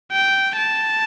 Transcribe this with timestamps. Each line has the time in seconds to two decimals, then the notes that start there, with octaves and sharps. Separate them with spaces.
0.12 G5
0.57 A5